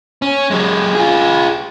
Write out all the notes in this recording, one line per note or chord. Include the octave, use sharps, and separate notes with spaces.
C#4
F#3 G#3
F4 G#4